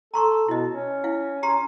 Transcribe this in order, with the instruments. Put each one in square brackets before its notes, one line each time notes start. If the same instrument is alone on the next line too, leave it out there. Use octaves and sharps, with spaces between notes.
[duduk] A4 [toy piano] A#5 C6 C#6
[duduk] B2 [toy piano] E4 D#5
[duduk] C#4
[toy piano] E4 F5
G4 A#5 C6